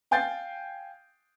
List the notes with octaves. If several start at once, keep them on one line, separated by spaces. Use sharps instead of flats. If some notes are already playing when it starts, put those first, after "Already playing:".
F5 G5 G#5 G6 A6 C7